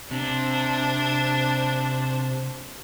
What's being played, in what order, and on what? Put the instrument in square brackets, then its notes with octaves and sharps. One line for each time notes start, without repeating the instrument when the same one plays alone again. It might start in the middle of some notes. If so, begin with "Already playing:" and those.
[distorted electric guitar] C3 [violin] D4 C5